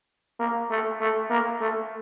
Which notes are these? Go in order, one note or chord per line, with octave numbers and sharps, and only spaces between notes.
A#3
A3
A3
A#3
A3